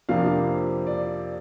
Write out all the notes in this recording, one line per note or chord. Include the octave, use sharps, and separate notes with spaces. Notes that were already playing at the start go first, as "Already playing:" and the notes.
F2 C3 F3 A#3 D4 F5
D5